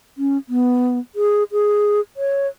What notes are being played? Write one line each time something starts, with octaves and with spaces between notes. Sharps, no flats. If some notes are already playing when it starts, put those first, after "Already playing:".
C#4
B3
G#4
G#4
C#5